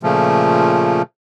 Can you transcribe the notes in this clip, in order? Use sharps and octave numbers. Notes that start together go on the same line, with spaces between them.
A#2 C#3 F3 A3